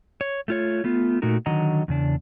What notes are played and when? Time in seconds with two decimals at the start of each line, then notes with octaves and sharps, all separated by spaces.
0.21 C#5
0.48 A3 F4 C#5
0.84 A3 B3 F4
1.22 A#2 A3 D#4 F#4 A#4
1.46 D3 D#3 F#3 D#5 F#5 A#5
1.88 E2 C#3 D4